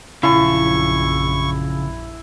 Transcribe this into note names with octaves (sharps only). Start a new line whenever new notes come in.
A#1 F#2 C#3 E4 F4 A5 C#6